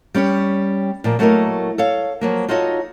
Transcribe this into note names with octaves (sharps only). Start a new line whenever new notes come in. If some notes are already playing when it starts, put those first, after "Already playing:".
G3 C#4 G4 C#5
A#2 F3 A#3
F#3 A3 A#3 E4 A#4 D#5
A4 C#5 F5
F3 F#3 A#3
D#4 F4 F#4 A4 C#5 D#5